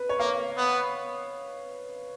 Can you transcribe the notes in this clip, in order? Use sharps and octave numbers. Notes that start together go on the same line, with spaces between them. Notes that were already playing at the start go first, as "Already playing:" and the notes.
Already playing: B4
C#5
A#3 F5
B3